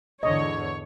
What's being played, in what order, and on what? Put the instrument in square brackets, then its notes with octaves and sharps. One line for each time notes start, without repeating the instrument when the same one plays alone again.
[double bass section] E2 G#2 D3 [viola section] C#5 [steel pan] D#5